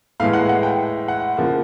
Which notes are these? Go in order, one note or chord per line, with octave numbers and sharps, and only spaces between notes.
A2 E3 G#3 F5
F#5
F#5
G5
F#5
C#3 F3 A#3